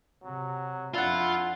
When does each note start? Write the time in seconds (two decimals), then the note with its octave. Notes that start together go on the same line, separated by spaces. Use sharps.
0.23 C3 F#3
0.94 F2 D4 E4 F4 F#5